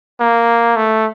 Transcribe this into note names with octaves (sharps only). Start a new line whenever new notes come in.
A#3
A3